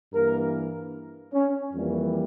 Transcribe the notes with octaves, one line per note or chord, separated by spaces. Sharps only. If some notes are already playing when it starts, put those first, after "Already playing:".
G2 E3 A#3 A#4
C#4
F2 E3 G3 A#3